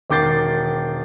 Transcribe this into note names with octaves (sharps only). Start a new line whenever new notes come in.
E1 D#3 D6 G6 A6 C7